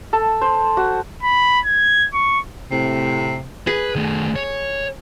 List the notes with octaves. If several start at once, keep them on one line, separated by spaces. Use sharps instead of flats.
A4
C5
F#4
B5
G#6
C#6
A2 C3
G#4 B4
D#3 A3
C#5